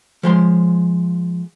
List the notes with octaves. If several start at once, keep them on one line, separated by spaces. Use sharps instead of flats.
F3 G#3 C6